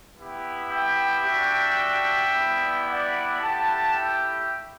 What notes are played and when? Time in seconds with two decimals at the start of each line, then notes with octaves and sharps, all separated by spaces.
0.16 B3 E4 G4
0.70 E5 G5
1.24 G3 D4 F#4
2.32 G3 B3 E4
2.86 D5 F#5
3.40 A3 E4 G4 F#5 A5
3.94 E5 G5